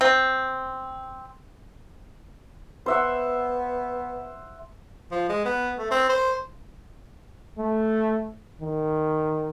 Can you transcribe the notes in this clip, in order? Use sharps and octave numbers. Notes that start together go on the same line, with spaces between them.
C4
B3 C5 E5 F#5
F3
G#3
B3
A3
C4
C5
A3
D#3